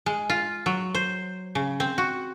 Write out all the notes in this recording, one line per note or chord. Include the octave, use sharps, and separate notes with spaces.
G#3
F4
F#3
C5
C#3
C4
F#4